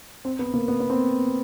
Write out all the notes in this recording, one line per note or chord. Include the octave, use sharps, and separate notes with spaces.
C4
B3
A#3
B3
B3
C4